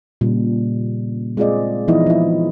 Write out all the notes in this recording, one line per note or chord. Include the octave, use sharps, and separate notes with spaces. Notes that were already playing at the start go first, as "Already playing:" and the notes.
A#2 C#3 G3
G#3 C4 F4 G#4 D5 D#5
E3 F3 B3 D#4 E4 D#5
F3 C4 E4